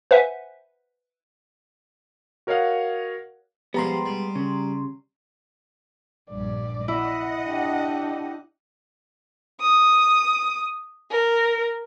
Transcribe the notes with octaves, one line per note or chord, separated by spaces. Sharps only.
B4 C5 E5 F#5 G#5
F#4 A#4 C#5 D#5 F5 F#5
F3 G3 G#3 B3 G4 A#5 C6
G3
C#3
A#1 G2 D5
E4 D#5 F#5
D4 G4
D#6
A#4